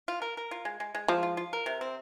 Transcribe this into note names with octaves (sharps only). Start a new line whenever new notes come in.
F4
A#4
A#4
F4
G#3
G#3
G#3
F3 G#3
F4
F4
A#4
C3
C4